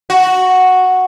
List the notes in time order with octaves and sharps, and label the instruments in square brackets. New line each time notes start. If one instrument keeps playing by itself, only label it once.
[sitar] F#4